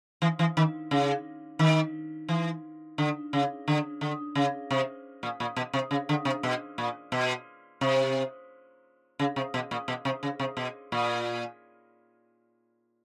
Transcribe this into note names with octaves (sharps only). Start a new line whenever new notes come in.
E3
E3
D#3
C#3
D#3
E3
D3
C#3
D3
D3
C#3
C3
A#2
A#2
B2
C3
C#3
D3
C3
B2
A#2
B2
C3
C#3
C3
B2
A#2
B2
C3
C#3
C3
B2
A#2